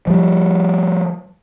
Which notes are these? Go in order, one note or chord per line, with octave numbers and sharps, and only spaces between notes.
F3 G3